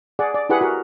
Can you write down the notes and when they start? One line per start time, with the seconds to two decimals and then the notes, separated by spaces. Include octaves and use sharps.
0.19 G#4 D5 F#5
0.34 D5
0.49 E4 G4 G#4 B4 F#5
0.61 F#4 A#4